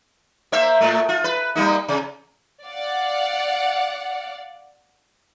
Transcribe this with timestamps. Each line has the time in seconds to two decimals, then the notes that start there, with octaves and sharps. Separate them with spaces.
0.52 A#3 C5 E5
0.81 A2 A3
1.09 F4
1.24 B4
1.55 G3 A#3 D#4
1.88 C3
2.63 D5 F5 F#5